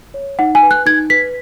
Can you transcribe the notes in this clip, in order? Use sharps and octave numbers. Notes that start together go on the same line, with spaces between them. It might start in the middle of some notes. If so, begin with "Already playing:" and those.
C#5
D#4 F#5
G#5
B4
F#6
D#4 G#6
B4 B6